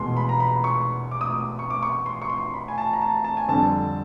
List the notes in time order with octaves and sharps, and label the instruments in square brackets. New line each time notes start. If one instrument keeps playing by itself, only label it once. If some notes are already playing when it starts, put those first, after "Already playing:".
Already playing: [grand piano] E2 B2 G#3 C6
B5
A#5
B5
C#6
D6
D#6
D6
C#6
D6
C#6
C6
C#6
C6
B5
G#5
A5
A#5
A5
A5
G#5
F2 D3 G3 C4 A5